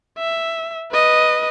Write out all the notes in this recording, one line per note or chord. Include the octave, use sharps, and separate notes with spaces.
E5
B4 D#5